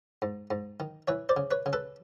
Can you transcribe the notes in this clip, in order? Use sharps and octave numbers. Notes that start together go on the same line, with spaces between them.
G#2
G#2
D#3
E3 B4 C#5
C5 D5
C#3
B4 C#5
C#3
A4 B4